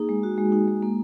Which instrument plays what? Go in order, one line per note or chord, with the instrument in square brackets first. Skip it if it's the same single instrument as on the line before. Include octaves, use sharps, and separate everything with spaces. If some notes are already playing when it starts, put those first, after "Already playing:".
Already playing: [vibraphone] A#3 D#4 G#4
G#3
F#4
G#3
D#4
G#3
A#3